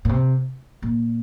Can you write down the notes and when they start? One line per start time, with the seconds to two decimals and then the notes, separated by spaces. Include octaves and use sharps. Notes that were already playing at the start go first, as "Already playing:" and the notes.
0.05 A#2
0.09 C3
0.82 A#2